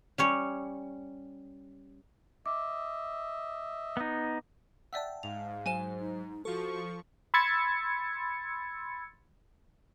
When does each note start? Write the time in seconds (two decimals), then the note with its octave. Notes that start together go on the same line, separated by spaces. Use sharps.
0.18 G3 C#4 C#5
2.46 D#5 E5 D6
3.97 B3 D#4
4.93 D5 E5 F#5 G5 A5 E6
5.23 G#2 F5 F7
5.66 F#3 C5 G#5 D#7 E7
6.00 D#4
6.45 F3 F#4 A4 C#6
7.34 B5 C6 E6 G#6 A6 C#7